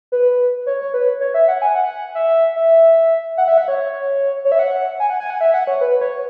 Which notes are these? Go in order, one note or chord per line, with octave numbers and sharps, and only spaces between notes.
B4
C#5
C#5
B4
C#5
E5
F#5
G#5
F#5
E5
E5
F#5
E5
F#5
C#5
C#5
E5
F#5
G#5
F#5
G#5
F#5
E5
F#5
C#5
B4
B4
C#5